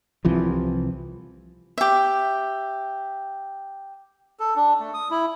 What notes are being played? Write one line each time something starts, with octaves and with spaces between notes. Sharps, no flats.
C2 C3 E3 F3
G4 E5
A4
D4
A3
D#6
E4